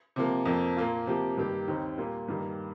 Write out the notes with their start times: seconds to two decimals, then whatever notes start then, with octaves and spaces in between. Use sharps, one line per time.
0.16 C3 F3 A#3
0.46 F2 F3 A#3
0.77 A#2 A#3 F4
1.07 C3 F3 A#3 G4
1.37 G2 D#3 A#3 G4
1.67 D#2 D#3 C4 D#4
1.98 A#2 G3 A#3 F4
2.28 G2 D#3 G3 A#3